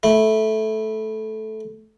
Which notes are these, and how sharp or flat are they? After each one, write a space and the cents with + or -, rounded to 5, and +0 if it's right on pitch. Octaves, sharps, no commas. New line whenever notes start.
A3 -10 E4 -10